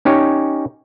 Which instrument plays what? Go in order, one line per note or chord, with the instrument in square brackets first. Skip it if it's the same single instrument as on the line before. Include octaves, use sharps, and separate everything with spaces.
[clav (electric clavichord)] C#4 D#4 G4 C#5